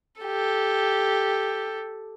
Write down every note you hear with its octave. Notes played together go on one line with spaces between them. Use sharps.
G4 A4